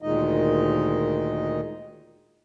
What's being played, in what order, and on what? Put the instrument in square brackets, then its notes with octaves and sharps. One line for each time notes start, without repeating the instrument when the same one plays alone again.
[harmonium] D2 A#2 D#3 G#3 D#4 D#5